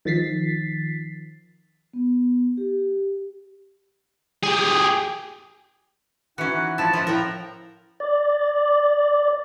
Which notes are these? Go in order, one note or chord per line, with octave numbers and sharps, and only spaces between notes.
D#3 F3 A6 B6 C7
B3
G4
G4 G#4
E3 C#4 D#4 F#4 F#5
F3 E4 A5
F3 E4 F#5
A2 A#4 F#5 G5
D5